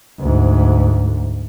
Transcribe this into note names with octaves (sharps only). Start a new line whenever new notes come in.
D2 G#2